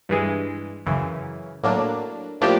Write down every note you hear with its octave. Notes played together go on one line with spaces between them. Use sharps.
G2 E3 G#3
F#2 C#3 E3
A2 F#3 A#3 D4
A2 F3 A#3 D4 G4